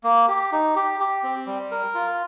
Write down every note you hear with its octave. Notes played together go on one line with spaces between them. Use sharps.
A#3
G4
D#4
G4
G4
C4
G3
A#4
F4